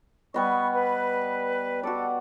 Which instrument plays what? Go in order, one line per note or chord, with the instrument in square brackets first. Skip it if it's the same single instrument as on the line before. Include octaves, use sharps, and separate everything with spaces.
[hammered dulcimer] G3 B3 D#5 [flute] C#6
[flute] B4
[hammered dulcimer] F#4 D5 [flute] A4